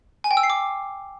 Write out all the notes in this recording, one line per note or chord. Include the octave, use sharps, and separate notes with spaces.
G#5
G5
E6
C7
D6